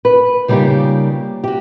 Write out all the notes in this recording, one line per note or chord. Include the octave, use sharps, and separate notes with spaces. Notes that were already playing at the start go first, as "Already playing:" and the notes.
B4
C#3 G3 A#3 D#4 F4 G4
F#4 G4